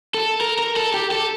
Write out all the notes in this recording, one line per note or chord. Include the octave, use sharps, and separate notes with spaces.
A4
A#4
A#4
A4
G4
A4